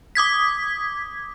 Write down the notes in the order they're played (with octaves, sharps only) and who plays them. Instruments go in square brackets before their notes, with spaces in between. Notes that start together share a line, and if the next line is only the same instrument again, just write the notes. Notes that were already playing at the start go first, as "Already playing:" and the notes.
[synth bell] D6 D#6 G#6 B6